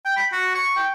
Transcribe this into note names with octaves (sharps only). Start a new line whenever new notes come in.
G5
B5
F#4
C#6
G5